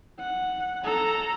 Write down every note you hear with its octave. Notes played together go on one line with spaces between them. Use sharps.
F#5
A4 A#5